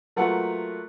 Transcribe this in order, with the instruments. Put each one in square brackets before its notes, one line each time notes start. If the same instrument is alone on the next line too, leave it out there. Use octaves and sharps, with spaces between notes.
[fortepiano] F#3 A3 A#3 F4 B4 F#5